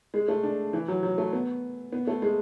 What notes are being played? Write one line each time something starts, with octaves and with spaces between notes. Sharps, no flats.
G#3
A3
D4
E3
F#3
F#3
A3
B3
B3
A3
G#3